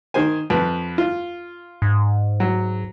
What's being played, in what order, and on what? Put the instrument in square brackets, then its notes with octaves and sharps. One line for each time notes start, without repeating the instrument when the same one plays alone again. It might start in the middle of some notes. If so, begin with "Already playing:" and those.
[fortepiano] D#3 C5 G#5
F2 B4
F4
[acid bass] G#2
[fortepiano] F#3